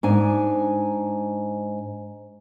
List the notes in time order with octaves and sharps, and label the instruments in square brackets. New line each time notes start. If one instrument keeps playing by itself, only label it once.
[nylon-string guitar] G#2 D4 G#5